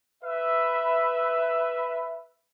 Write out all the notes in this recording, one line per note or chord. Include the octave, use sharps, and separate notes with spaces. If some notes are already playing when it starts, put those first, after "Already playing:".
B4 E5